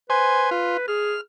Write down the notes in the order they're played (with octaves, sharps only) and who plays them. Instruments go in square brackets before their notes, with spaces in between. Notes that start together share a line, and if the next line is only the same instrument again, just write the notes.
[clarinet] B4 [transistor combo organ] C5 G#5
[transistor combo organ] F4
[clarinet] G#4 [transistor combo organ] F6